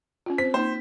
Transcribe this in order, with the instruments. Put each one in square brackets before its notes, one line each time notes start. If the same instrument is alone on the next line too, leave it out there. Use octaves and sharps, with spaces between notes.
[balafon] C#4 F4
[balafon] C4 C5 [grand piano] B6
[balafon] A#3 D#4 [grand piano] C5